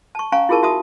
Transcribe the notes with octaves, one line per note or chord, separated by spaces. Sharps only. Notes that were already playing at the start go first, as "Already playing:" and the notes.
A5 C#6
C#4 F5 G#5 A#5 C#6
E4 F4 G#4 A#4 A5 C#6
F#4 E5 A5 D#6